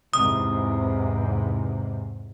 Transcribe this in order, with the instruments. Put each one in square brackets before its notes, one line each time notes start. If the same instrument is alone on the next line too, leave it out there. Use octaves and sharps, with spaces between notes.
[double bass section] E2 G#2 C3 [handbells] D#6